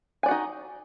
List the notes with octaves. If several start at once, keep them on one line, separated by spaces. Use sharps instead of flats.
D#4 F#4 D5 G#5